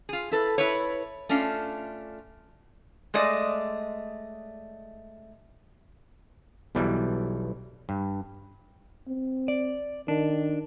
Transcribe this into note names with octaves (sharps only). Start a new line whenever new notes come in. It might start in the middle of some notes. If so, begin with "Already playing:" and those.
F4 G#4
E4 A4 B4
E4 B4 C#5
A3 C#4 D4 F4
G#3 A3 D5 D#5
B1 B2 E3 G3
G2
C4
D5
D#3 D4